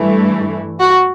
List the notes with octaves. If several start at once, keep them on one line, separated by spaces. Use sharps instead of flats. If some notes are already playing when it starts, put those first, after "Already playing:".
Already playing: G2 E3 A3
F#4